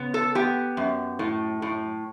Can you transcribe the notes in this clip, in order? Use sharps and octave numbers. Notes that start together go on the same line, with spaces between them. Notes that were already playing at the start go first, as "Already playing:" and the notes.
Already playing: C#3 B3
A4
B3 G4
F#2
A2
A2